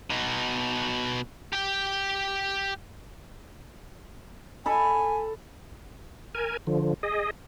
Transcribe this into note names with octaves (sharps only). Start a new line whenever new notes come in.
B2 D#4
G4 G5
A4 G#5 B5
A#4 G#5
D3 F3
G#4 D#5